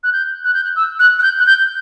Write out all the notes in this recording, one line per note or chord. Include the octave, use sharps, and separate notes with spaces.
F#6
G6
F#6
G6
F#6
E6
F#6
F#6
G6
F#6
G6